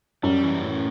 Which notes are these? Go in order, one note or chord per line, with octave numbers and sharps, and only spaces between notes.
F#2 G3
E3
A2